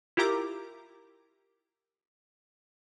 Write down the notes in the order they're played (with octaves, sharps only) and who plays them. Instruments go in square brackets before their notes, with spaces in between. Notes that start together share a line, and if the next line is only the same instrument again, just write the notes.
[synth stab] E4 F4 G4 A#4 A#5 D6